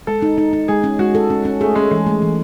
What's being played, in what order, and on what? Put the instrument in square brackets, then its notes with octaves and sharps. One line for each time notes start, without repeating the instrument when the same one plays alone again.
[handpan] G#3 [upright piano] A4
[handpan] D#4
D#4
D#4
[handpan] G#3 [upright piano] G#4
[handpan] C#4
[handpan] G#3 [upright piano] F#4
[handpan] A4
C#4
C#4
[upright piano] A3 [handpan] G#4
[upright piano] G#3 [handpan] C#4
[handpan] E3 [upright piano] G#3
[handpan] A3
E3